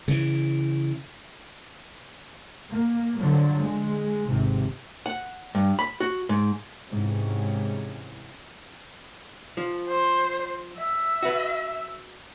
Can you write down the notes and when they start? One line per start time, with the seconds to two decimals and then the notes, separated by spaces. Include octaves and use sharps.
0.08 C#3 E3
2.70 A#3
3.20 D3 F3 F#3
3.60 G#3
4.28 G#1 C3
5.06 F#5
5.55 G2
5.79 B5
6.00 F#4
6.29 G#2
6.87 G#2 C3 E3 C#4
9.57 F3
9.88 C5
10.78 E5
11.23 F#4 B4